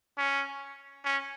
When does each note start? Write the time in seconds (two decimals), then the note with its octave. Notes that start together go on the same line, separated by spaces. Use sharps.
0.18 C#4
1.04 C#4